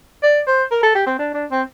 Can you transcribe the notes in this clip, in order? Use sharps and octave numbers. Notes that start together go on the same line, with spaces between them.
D5
C5
A#4
A4
G4
C4
D4
D4
C4